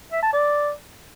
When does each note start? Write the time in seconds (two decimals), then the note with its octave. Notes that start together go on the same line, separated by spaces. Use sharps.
0.12 E5
0.22 A5
0.33 D5